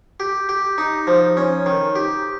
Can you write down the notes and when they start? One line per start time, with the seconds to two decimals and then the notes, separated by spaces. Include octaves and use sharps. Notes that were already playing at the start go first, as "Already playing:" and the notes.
0.20 G4
0.49 G4
0.78 D#4
1.07 F3
1.37 C#4
1.66 D#3
1.96 G4